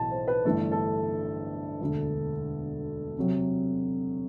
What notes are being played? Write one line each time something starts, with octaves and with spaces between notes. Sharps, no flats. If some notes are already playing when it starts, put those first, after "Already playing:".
Already playing: B1 A2 E3 A5
C5
B4
G1 G2 E3 A3 A4
A4
E1 D2 D3
C3 F#3